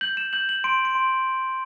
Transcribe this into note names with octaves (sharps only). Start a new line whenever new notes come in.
G6 F#7
E7
G6 F#7
F#7
C6 D7
D7
C6